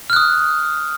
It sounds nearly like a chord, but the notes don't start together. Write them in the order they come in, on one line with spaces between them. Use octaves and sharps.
F6 F#6 D#6